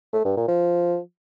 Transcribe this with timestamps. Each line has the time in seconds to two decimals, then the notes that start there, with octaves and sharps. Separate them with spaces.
0.13 A3
0.25 G2
0.37 A#2
0.48 F3